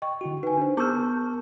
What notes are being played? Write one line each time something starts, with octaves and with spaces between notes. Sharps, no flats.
D#5 G5 C#6
D3 E4 F#4
D#4 B4 G#5
D4 C5
B3 A#4 A5 C#6 D6 E6 F6 G6